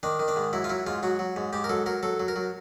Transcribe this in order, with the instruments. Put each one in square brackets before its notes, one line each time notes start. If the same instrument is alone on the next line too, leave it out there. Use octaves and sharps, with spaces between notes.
[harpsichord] D#3 D4
D#3
D4
G#2
F#3 E4
F4
F#3 E4
G#2 F4
F#3 F#4
F#3
G#2
G#2 G4
A#4
F#3 A4
F#3 A#4
F#3 A4
F#3
A#4
F#3